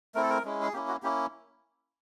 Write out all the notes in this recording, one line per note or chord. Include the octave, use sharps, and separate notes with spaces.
A3 C4 E4 A#4
A4
A#4
G#3 C#4 E4
G#4
A#3 C#4 E4 G4
F#4
A#3 C#4 E4 G4